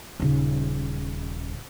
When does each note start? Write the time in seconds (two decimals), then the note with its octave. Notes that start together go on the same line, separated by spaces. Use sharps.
0.20 D#1 C#3